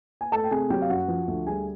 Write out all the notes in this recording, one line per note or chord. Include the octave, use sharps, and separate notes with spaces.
G#5
A3 A4 A5
G5
C3 G#4 G#5
F#3 G4 G5
F5
F#2 F#4 F#5
F3
D2
G3 G#4 G#5